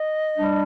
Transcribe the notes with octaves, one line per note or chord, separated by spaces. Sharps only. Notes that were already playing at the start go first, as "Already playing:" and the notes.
Already playing: D#5
G3 D4